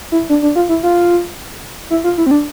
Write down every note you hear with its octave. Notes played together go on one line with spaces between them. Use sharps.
E4
D4
D4
F4
E4
F4
E4
F4
E4
C4
D4